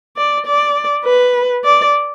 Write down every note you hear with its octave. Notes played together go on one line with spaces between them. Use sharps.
D5
D5
B4
D5